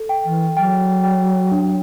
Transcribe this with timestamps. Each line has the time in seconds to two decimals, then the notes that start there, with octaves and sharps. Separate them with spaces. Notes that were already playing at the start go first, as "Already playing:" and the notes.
Already playing: A4
0.09 G5
0.25 E3
0.57 F#3 G5
1.04 G5
1.51 D4